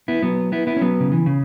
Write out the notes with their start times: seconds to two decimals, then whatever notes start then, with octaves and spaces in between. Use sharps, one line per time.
0.08 B3 E4
0.22 F#3 B3
0.52 B3 E4
0.67 B3 E4
0.76 C#4
0.81 F#3 B3
1.00 C#3
1.12 E3
1.26 C#3